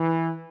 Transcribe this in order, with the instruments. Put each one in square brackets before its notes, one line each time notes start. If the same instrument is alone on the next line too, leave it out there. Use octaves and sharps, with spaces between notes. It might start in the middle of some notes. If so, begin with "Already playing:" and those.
Already playing: [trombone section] E3